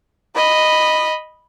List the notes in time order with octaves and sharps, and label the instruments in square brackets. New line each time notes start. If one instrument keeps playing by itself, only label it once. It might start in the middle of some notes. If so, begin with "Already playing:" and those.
[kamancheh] D#5 B5